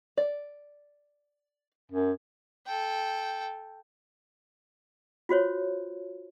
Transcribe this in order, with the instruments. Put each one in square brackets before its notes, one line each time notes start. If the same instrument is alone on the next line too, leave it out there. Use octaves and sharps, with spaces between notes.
[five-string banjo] D5
[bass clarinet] F#2
[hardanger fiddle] A4 G5
[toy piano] F4 F#4 C5 C#5